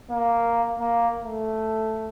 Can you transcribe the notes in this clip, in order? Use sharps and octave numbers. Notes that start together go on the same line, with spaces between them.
A#3
A#3
A3